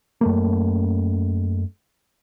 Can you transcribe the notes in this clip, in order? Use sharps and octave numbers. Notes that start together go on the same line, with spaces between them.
F#2 A3 A#3